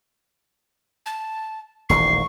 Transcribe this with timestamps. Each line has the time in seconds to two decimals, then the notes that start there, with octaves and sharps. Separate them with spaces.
1.06 A5
1.90 D#1 A1 D#3 C#6 C7